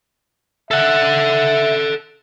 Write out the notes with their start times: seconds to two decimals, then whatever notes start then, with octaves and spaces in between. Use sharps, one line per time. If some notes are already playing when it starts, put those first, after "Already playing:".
0.71 A4 E5 F#5